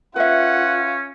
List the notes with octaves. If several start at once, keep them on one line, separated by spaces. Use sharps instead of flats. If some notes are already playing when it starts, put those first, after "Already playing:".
C#4 F4 B4 E5 F#5